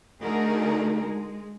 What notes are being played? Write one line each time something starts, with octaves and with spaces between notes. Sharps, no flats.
D3 A3 D#4 F#4 G#4 A#4
G#3